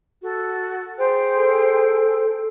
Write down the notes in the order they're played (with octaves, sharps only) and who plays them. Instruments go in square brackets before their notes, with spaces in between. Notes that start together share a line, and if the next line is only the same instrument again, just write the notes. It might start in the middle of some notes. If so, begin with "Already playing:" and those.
[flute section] F#4 A4
G#4 C5 G5
[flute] A4